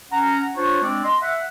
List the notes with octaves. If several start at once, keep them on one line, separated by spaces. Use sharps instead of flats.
C#4 F#5 A#5
D4 F4 C5 C#5
G#3 C4 D4 D5
D#5 C6
E5 F#5